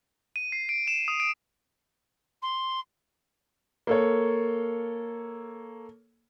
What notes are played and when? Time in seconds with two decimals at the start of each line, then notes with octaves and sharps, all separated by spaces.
0.36 D#7
0.52 C7
0.69 D7
0.88 E7
1.08 D#6
1.20 D7
2.42 C6
3.87 A#3 A4 C#5